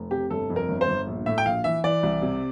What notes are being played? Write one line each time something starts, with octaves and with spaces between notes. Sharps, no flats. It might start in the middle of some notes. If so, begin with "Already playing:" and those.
Already playing: F1
C3 G4
G1 A4
F2
A#4
G1
C5
G1
A#1
A2 E5
G5
A#1 F5
E3 E5
E3 D5
C2
C3